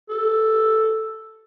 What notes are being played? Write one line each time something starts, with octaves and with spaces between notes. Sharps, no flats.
A4